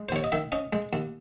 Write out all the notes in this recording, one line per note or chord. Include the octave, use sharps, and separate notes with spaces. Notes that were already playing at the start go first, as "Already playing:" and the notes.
Already playing: G#3
C5
D#2 C#5
D#5
D#3 E5
C#4 D#5
G#3
D#2